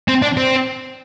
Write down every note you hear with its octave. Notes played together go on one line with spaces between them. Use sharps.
C4
D4
C4